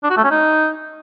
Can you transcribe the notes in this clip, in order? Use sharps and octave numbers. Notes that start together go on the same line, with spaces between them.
D4
F#4
A3
C#4
D#4